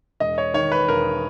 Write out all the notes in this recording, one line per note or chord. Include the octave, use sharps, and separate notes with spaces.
E1 D#5
C#5
D#3 C#5
B4
E1 A#4